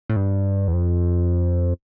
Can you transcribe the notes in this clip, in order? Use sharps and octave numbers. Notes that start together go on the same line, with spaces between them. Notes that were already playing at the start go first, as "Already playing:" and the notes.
A2
G2
E2
F2